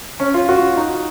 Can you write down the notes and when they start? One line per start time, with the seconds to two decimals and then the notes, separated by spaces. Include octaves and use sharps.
0.20 C#4
0.34 F4
0.49 F#4
0.77 D#4